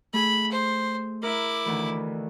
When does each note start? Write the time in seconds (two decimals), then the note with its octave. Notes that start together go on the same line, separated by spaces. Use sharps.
0.13 A3 G#4 B5
0.52 C5
1.23 E4 A#4 D6
1.65 D2 D#3 E3